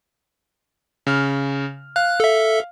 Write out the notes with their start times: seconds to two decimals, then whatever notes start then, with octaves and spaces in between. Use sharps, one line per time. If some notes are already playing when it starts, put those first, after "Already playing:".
1.07 C#3 F6
1.96 F5 F#6
2.20 A4 E5